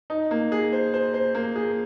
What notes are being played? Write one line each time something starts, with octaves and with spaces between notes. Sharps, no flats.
D#4
A#3
G#4
C5
C5
C5
A#3
G#4